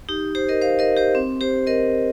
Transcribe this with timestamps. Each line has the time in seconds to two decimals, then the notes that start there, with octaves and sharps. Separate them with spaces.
0.09 D#4 G4
0.35 G4 C5
0.49 A#4 D#5
0.61 C5 F5
0.79 A#4 D#5
0.97 G4 C5
1.15 C4
1.41 G4 C5
1.67 A#4 D#5